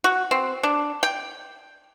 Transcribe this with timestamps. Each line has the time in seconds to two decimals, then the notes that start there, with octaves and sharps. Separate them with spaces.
0.04 F#4
0.31 C4
0.63 D4
1.03 G5